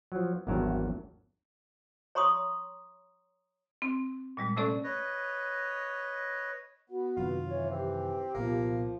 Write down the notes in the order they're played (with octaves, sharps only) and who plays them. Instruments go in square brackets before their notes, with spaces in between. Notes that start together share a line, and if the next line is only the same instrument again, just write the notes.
[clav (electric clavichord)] F3 F#3
G#1 E2 G2 F#3 A#4 A5
[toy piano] C#5 A#5 C6 C#6 D#6
[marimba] C4
A#2 G3 G#3
C3 A3 C#4 A4 D5 C#6
[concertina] B4 C#5 D#5
[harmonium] B3 [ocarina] F#4
[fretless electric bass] F#2 C3 D#3 [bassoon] F4
[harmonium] E3 [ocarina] C#5
[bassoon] C4 [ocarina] G4
[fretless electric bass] C2 A#2 B3 [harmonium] F3 [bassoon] A#3